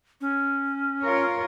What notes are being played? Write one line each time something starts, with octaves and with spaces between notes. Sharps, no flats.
C#4
F4 A#4 C#5